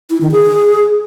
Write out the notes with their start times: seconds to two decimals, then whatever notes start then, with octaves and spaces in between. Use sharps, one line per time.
0.10 E4
0.21 D#3
0.31 G#4